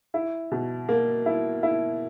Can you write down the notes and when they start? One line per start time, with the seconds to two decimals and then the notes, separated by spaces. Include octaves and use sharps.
0.14 E4
0.51 B2
0.89 A#3
1.26 E4
1.63 E4